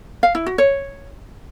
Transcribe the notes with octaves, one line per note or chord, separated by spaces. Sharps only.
F5
E4
F#4
C#5